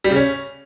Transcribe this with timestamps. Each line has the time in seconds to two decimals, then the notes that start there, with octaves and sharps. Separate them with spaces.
0.04 G3
0.10 C#3
0.16 C#4